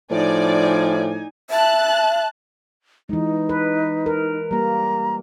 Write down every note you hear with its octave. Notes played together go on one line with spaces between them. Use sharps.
A2 F3 D#4 D5 G#5
E5 A5 F#6
E3 G#3 D#4
B4
A#4
G3 A#3 A#5